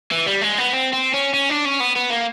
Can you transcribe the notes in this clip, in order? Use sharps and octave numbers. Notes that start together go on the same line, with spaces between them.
E3
G3
G#3
B3
C4
C4
C#4
C#4
D4
C#4
B3
B3
A#3